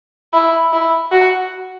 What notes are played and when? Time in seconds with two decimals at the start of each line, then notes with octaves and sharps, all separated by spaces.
0.33 E4
0.73 E4
1.12 F#4